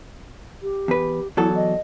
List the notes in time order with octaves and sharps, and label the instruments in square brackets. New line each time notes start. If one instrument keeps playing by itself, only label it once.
[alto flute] G4
[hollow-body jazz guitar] E2 B4
[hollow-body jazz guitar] E2 F#3 A4 [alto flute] E4
[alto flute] D#5